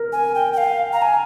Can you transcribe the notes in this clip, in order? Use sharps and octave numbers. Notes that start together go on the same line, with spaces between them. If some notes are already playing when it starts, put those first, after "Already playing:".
Already playing: A#4
G#5
G5
G5
F5
A#5
G#5